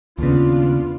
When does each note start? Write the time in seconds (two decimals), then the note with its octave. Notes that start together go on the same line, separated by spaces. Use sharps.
0.18 D#2 C#3 B3 D4 F4